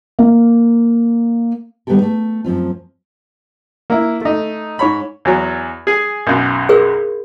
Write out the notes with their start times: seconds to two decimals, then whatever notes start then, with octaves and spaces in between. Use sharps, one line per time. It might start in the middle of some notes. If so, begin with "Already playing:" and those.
0.19 A#3
1.87 D#3 G3 B3 G4 A4 A#4
2.02 A3
2.44 F#2 F3 C4 F4
3.90 A#3 E4
4.21 A3 D#4
4.79 G#2 C#5 B5
5.25 E2 F#3
5.87 G#4 G#5
6.27 B1 F#2
6.69 G#4 A#4